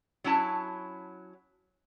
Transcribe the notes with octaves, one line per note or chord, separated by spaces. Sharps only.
F#3 C#4 E4 A5